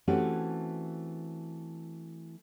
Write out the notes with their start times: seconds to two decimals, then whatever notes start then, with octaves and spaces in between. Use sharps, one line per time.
0.07 E3 A3 C4 C#4 F#4 G4